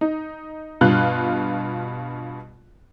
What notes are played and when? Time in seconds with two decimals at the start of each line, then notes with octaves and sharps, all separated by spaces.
0.01 D#4
0.81 G2 B2 F4 F#6